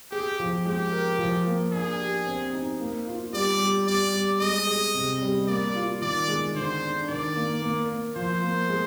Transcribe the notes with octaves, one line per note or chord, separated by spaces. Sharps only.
G4 G#4
F3
G#3 G4
A#4
F3
A#3
D4 G#4
G4
C4
D#4
A#3
F4
G3 D5
G3
G3 D5
G3
G#3 D#5
G#4
C3
G3
A#3 D5
F4
D#3 D5
G#3
D3 C5
D4
D#3 D5
A#3
A#3
A#3
F3 C5
A#3
G#3